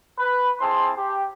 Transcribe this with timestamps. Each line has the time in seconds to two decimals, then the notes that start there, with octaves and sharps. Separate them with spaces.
0.19 B4
0.60 C4 E4 G#4 C5 A5 C6
0.97 G4